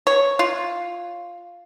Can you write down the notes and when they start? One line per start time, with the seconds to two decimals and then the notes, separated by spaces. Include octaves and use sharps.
0.07 C#5
0.39 F4